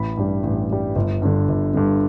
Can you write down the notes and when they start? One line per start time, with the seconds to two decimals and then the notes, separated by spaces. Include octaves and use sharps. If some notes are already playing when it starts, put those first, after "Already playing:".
Already playing: A1 B5
0.17 G2 G3
0.43 A1
0.70 G2 G3
0.96 G1
1.22 G2 D3
1.48 G1
1.74 G2 D3